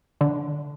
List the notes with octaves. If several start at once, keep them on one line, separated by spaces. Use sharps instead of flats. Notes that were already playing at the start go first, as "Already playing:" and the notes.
D3